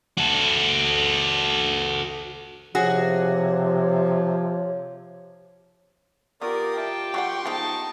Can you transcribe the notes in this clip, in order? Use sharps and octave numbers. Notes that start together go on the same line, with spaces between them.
F#4 A4
C3 F3 F#4 G#4 C#5
D#3 B3 F4 G4 A#4 D5 D#6
E4 G5 A5
F#3 G3 F#5 C6 C#6
F3 G#3 B3 D#4 A5